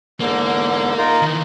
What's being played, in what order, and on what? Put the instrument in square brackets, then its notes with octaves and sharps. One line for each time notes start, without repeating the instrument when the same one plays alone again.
[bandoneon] E2 G#2 D3 [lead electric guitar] A#3
[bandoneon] D#4 F4 A#4
[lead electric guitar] D#3 E3